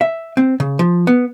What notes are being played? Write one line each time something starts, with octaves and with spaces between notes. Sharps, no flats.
E5
C4
C#3
F3
B3